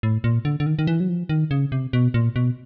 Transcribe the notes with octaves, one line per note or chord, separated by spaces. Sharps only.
A2
A#2
D3
D3
D#3
D#3
E3
F#3
F3
D#3
C#3
C3
B2
A#2
B2